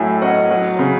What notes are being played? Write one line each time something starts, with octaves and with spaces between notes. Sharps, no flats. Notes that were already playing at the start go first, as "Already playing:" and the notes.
Already playing: A2 F#3 E5 G#5
C#4 D#5 F#5
F#3
C#3